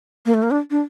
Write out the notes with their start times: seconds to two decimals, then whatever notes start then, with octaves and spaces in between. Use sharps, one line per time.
0.26 A#3
0.34 A3
0.43 A#3
0.51 D4
0.71 D4